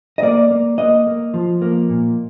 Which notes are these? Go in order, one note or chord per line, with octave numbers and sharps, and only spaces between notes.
D#5
A#3 D5
A#3
A#3 D#5
A#3
F3
A#3
A#2